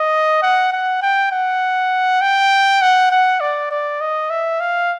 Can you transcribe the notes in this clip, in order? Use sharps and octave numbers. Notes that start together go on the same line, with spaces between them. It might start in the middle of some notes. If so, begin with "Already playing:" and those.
Already playing: D#5
F#5
F#5
G5
F#5
G5
F#5
F#5
D5
D5
D#5
E5
F5